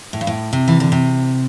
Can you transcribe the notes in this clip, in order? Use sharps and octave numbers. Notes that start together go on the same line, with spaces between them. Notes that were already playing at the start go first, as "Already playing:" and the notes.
A2
G2
A2
C3
E3
D3
C3